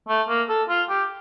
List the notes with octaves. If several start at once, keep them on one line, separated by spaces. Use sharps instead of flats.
A3
A#3
A4
F4
G4